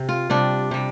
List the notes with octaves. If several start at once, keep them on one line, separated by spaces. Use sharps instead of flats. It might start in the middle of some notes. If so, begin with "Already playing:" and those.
Already playing: C3
F4
C3 G3 D4
C3 G3